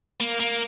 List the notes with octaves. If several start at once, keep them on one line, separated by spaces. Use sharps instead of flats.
A#3
A#3